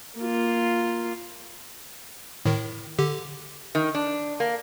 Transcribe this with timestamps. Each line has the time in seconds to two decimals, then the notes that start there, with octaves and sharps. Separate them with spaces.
0.19 A#3 F4
2.45 A2 D#3
2.99 D3 G4
3.75 D#3
3.95 D4
4.40 A#3